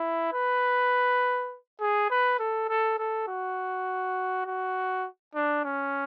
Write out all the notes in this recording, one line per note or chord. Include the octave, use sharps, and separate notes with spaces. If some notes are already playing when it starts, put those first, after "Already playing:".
Already playing: E4
B4
G#4
B4
A4
A4
A4
F#4
F#4
D4
C#4